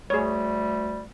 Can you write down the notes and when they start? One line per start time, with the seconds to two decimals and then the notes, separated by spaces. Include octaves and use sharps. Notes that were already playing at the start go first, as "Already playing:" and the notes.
0.10 D2 G3 G#4 C#5